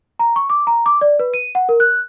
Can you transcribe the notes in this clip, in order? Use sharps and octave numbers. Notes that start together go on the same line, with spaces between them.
A#5
C#6
D6
A#5
D6
D5
B4
D#7
F#5
A#4
F#6